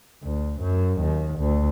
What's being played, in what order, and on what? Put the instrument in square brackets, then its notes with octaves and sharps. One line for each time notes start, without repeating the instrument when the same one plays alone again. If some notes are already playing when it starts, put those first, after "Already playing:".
[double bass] D2
F#2
D#2
D2